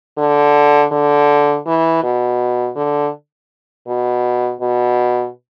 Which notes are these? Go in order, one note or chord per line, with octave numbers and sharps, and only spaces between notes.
D3
D3
E3
B2
D3
B2
B2